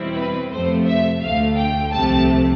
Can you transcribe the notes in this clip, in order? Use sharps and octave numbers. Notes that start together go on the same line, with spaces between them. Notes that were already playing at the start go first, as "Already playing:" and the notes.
Already playing: E2 B2 G3 C4 E4
B4
F2 C3 F3 A3 C5
E5
D2 D3 A3 F5
G5
C2 C3 F3 A3 A5